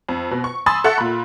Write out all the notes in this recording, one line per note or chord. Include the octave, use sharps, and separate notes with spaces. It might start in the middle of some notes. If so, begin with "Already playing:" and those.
F2
B2
C#6
G#5 B5 C6 D#6 E6 A6
A4 E5 F#5 C#6 F#6
A#2 B5